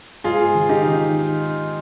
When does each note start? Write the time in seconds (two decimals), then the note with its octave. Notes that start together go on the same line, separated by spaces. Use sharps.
0.24 G#2 F4 G#4
0.54 D#3
0.69 D#4 G4
0.84 D#3